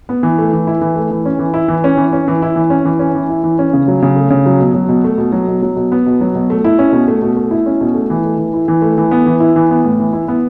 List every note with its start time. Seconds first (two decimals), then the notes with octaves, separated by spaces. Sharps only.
0.09 B3
0.23 E3
0.38 A3
0.53 E3
0.67 E4
0.81 E3
0.96 A3
1.11 E3
1.25 C#4
1.39 E3
1.54 E4
1.68 E3
1.84 C#4
1.97 E3
2.13 C#4
2.28 E3
2.42 E4
2.56 E3
2.70 C#4
2.85 E3
2.99 C#4
3.15 E3
3.29 E4
3.44 E3
3.59 C#4
3.73 C#3
3.88 F#3
4.02 C#3
4.16 A3
4.30 C#3
4.46 F#3
4.60 B2
4.74 F#3
4.89 B2
5.04 A3
5.18 B2
5.32 F#3
5.48 B2
5.62 F#3
5.76 B2
5.92 B3
6.06 B2
6.21 F#3
6.35 B2
6.50 A3
6.64 E4
6.79 C#4
6.93 B2
7.08 A3
7.22 B2
7.37 A3
7.51 E4
7.66 C#4
7.81 B2
7.94 A3
8.10 E3
8.24 A3
8.38 E3
8.54 E4
8.68 E3
8.82 A3
8.98 E3
9.11 B3
9.26 E3
9.40 E4
9.56 E3
9.70 B3
9.84 A2
10.00 E3
10.13 E4
10.28 B3